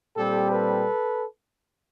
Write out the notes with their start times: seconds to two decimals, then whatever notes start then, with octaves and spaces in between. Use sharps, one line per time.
0.15 A#2 G3 C4 G4 A4
0.50 A4 B4